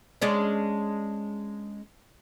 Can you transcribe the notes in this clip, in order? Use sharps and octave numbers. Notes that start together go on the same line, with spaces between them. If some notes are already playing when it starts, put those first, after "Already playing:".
G#3 C#4 D4